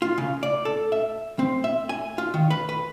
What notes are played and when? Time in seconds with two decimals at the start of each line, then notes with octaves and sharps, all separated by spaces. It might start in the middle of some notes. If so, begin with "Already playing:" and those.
0.02 F4
0.18 C#3
0.43 D5
0.65 A4
0.92 E5
1.39 C4
1.64 E5
1.89 G#5
2.18 F4
2.34 D#3
2.50 B4
2.69 B4